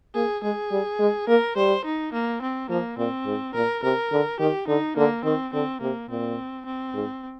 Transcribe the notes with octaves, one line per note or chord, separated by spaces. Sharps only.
A#3 G#4
G#3 G#4
G3
G#3
A#3 A#4
G3 C5
D#4
A#3
C4
F3 A#3
A#2 C4
G#2
A#2 A#4
C3 A#4
D3
D#3 G4
D3 D#4
D3 A#3
D#3 C4
D3 C4
C3 A#3
A#2 C4
C4
G#2